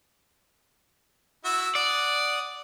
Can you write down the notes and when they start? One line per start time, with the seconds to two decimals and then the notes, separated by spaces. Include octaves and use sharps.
1.45 E4 F#4 E5
1.75 D5 F#5 D#6